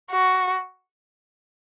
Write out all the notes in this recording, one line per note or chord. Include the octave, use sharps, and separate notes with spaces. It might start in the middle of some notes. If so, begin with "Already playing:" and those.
F#4